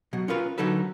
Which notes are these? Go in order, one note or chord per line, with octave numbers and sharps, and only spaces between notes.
B2 F#3
C#4 F4 A#4 B4
D3 F#3 D#4 A4 B4